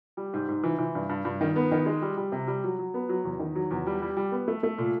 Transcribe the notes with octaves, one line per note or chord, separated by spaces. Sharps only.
G3
G#2
G#2
E3
E3
G2
G2
G2
D#3
B3
D#3
G#3
G3
G3
C3
G3
F#3
F#3
B3
F#3
E2
D#3
F#3
E2
G3
G3
G3
B3
A3
A3
A#2